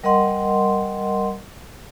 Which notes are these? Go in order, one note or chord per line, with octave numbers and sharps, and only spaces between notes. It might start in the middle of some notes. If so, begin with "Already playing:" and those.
G3 A#4 D#5 F#5 C6